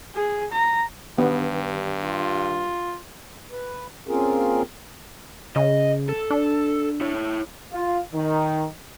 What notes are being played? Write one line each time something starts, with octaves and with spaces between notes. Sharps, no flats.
G#4
A#5
G2 D#3 B3 D4 G4
F4
B4
A#3 C4 C#4 F4 G#4 A#4
C#3 D#5
A4
D4
E4 C#5
F4
D#3